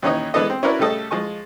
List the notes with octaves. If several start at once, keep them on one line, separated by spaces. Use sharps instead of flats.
D#2 E3 C#4 D#4 C#5 D#5
E3 G#3 B3 D4 A4 D#5
C4
C#4 E4 F#4 A#4 B4 D5
C#3 G3 A3 A4 D#5
F3 G#3 G#5 C#6